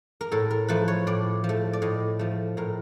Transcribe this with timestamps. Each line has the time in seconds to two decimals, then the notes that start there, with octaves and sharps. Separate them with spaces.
0.21 A#4
0.31 A2 A4
0.51 A#4
0.68 F3 A3 B4
0.88 C#5
1.07 A2 D5
1.44 F3
1.49 A3
1.73 D5
1.82 A2 D#5
2.19 F3 A3
2.57 A2 A#4